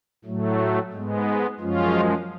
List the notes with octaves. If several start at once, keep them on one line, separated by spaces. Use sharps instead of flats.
A2 F#3 A3
G#2 G#3 B3
F#2 F3 G#3 C#4 F4